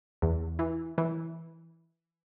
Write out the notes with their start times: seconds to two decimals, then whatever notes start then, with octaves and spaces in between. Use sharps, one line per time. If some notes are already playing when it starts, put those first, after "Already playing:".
0.22 E2
0.59 E3
0.98 E3